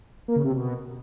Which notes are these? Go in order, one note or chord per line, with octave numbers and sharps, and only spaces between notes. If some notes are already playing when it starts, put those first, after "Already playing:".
A#3
C#3
C3
B2